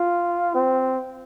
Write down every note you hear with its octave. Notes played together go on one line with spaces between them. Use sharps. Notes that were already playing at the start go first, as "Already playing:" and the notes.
Already playing: F4
C4